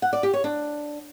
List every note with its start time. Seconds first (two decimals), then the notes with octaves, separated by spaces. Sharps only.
0.02 F#5
0.13 D5
0.23 G4
0.34 C#5
0.44 D4